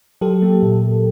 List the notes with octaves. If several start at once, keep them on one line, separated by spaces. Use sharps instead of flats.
F#3 G4 A4
A#3
A#2